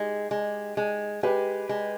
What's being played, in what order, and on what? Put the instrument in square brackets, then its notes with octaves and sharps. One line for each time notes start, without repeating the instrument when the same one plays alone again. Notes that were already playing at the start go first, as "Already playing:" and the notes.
Already playing: [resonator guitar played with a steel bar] G#3 [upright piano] D#4 G4
[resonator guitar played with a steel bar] G#3
G#3
[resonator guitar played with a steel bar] G#3 [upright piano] G4 B4
[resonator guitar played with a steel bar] G#3